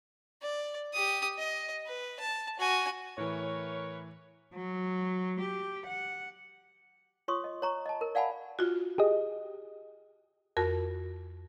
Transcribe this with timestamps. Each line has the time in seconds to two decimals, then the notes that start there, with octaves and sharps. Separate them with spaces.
0.42 D5
0.93 G4 D#6
1.38 D#5
1.86 B4
2.20 A5
2.59 F#4 G#5
3.18 A2 E3 A#4 B4 C#5
4.54 F#3
5.40 G4
5.86 F#5
7.28 F4 C#5 C6 C#6 D#6
7.44 D#5
7.62 C#5 A#5 C#6
7.86 D#5 A5
8.01 A#4
8.15 D5 F5 F#5 G#5 A5 B5
8.59 F4 F#4
8.98 G4 G#4 D#5
10.57 F2 F#4 A#4